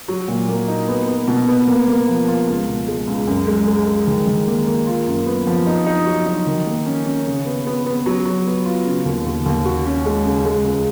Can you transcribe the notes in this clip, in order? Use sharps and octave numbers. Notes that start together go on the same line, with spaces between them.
F#3
A#2
A#3
D#4
B3
B3
B2
B3
A#3
A#3
F3
F4
C#2
B2
G#3
C#2
F#2
G#3
G#3
G#3
D#3
D#3
A#3
A#3
F4
F#2
B3
F3
D#4
D#4
F#3
D#4
D#3
A#3
C#4
C#4
C#3
B3
B3
B3
F#3
F#3
B3
F4
C#3
D#2
D#2
D#2
F#4
C#4
G#3
C#3
G#3
C#2